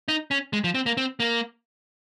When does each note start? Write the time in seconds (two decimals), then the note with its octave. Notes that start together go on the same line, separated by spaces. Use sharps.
0.08 D#4
0.31 C#4
0.53 G#3
0.64 F3
0.75 C4
0.86 A#3
0.97 C4
1.20 A#3